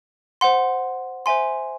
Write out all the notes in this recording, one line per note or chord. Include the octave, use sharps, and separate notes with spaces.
C5 F#5 C6
C5 E5 G#5 C6